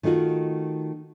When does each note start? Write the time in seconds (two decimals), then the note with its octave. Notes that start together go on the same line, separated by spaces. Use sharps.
0.03 D#3 A3 D#4 F4 F#4